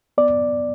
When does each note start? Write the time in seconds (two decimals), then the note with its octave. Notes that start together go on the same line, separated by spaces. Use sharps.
0.18 B3 D5